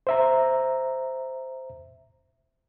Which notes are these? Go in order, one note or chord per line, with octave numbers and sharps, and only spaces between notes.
C5 E5 A#5